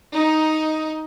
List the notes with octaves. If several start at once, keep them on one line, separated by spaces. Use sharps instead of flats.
D#4